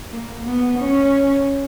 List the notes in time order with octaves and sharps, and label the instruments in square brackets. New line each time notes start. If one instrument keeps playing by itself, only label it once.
[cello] A#3
B3
C#4